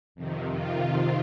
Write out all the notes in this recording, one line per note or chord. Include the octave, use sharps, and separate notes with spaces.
F2 C3 D#3
F4